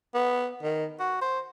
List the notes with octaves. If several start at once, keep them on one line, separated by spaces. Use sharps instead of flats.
B3
D#3
F#4
C5